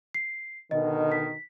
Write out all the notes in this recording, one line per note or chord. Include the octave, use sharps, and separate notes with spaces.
C7
B2 D3 D#3 D#5
B6